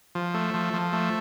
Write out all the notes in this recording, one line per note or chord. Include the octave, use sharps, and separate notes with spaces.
F3
A3
F3
F3
A3